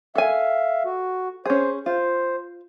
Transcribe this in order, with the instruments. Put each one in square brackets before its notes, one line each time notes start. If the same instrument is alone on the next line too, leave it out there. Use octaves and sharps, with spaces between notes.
[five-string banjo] A4 G#5 [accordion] E5 F5
[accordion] F#4
[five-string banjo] C#4 G#4 [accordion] C5
[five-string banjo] F4 [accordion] C5